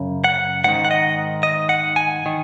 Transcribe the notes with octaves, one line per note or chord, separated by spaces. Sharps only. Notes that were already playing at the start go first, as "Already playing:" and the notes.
Already playing: F#2 C#3
F#5
G#2 D#3 F#5
F#5
D#5
D#5
F#5
G#5
D#3